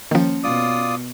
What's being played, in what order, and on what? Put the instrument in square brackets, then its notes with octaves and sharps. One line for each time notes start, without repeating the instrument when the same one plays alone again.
[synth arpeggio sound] D#3 F3 [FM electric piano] A#3 C#4
[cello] B2 [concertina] F4 D5 D#6